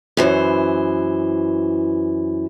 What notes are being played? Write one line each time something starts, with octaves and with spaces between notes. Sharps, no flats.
F#2 E3 C5